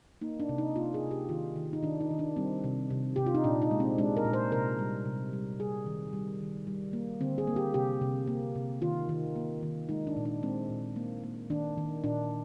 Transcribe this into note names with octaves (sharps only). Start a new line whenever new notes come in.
A#3 D#4
D4
C3
D#4
A#3 F4
G#4
C3
G4
D#3 F4
D#3
D#4
D#3 D4
D#4
D#3
D4
G3 C4
C3
C3
C3 G4
F4
D#4
A#2 D4
D#4
G#3
C4
G#3 D4
A#4
A#2
C5
C3 A#4
G3
C3
G3
G3 G#4
D#3
G3
D#3
G3
A#3
D3 C4
G#4
A#3
G4
C3 G4
C3
A#3
C3
D#3 F4
D#3
A#3
D#3
G#3 D#4
D4
A#2
D4
G#3 C4
A#2
A#3
A#3
D#3 D4
D#3
A#2 D4